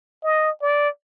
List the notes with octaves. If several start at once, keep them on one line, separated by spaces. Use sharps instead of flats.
D#5
D5